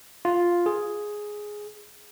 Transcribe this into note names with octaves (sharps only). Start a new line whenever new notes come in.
F4
G#4